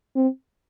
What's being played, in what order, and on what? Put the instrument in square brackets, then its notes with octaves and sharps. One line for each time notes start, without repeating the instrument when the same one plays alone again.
[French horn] C4